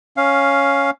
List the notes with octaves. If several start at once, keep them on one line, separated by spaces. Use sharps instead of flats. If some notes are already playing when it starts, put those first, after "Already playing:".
C#4 F5